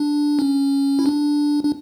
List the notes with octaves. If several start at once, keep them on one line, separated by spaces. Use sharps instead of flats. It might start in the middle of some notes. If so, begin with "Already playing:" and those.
Already playing: D4
C#4
E4
D4
D4